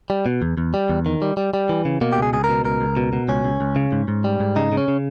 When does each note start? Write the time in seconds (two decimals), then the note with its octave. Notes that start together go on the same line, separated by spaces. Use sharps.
0.10 G3
0.26 B2
0.42 E2
0.58 E2
0.74 G3
0.89 E2
1.06 D#3
1.22 G3
1.37 G3
1.54 G3
1.69 E3
1.85 C#3
2.01 B2 A#3
2.13 G4
2.17 C#2
2.22 G#4
2.33 C#2 G#4
2.44 A#4
2.49 B2
2.65 C#2 A#4
2.81 C#2
2.97 B2
3.13 B2
3.28 C#2 C#4
3.45 C#2
3.61 C#2
3.76 C#3
3.92 G#2
4.08 G#2
4.24 G3
4.40 G#2
4.56 C#3 D#4
4.72 C#3
4.77 C#4
4.88 C#3